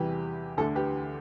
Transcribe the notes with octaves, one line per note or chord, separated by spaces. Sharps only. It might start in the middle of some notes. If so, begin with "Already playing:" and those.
Already playing: E2 C3 E3 G3 G4 B4
D2 D3 A3 A4
G4 B4